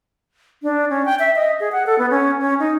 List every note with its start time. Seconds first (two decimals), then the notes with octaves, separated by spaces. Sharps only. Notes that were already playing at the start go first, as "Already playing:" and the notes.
0.63 D4
0.90 C#4
1.05 G5
1.19 E5
1.36 D#5
1.60 G#4
1.72 F#5
1.86 A4
1.98 B3
2.11 C#4
2.40 C#4
2.59 D#4